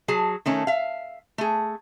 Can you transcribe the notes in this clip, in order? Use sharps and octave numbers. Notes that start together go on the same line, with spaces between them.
F#3 G#4 A5
D#3 A3 C#4
E5 F5
A3 G#4